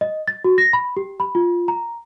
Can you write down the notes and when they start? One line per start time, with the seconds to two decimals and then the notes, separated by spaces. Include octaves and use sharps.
0.01 D#5
0.28 A6
0.44 F#4
0.58 A#6
0.73 B5
0.97 G4
1.20 B5
1.35 F4
1.68 A#5